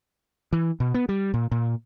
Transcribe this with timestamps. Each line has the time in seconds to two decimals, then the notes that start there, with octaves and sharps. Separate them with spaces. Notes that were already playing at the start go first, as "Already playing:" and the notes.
0.53 E3
0.80 B2
0.94 B3
1.09 G3
1.34 A#2
1.51 A#2